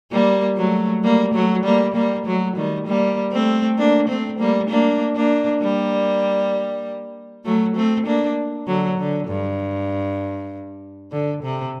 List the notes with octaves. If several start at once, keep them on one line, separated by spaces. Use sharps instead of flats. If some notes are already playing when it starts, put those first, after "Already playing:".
G3 A#3
F#3 A3
G3 A#3
F#3 A3
G3 A#3
G3 A#3
F#3 A3
D#3 G3
G3 A#3
A3 C4
A#3 D4
A3 C4
G3 A#3
A#3 D4
A#3 D4
G3 A#3
F#3 A3
A3 C4
A#3 D4
D3 F#3
D3
G2
D3
C3